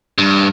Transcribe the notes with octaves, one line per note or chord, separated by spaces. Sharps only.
G2